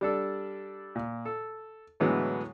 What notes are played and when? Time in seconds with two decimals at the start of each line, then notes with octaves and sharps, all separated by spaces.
0.01 G3 D4 A4
0.95 A#2
1.25 A4
2.00 A2 D3 E3 F#3 G#3 B3